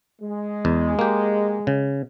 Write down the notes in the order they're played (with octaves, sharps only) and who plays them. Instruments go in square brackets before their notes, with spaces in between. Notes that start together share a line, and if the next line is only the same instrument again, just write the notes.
[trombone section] G#3
[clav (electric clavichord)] E2
A#3 G4
C#3